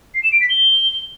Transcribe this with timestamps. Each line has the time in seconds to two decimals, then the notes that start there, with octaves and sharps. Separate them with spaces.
0.15 C7
0.23 E7
0.32 D7
0.41 B6
0.50 G7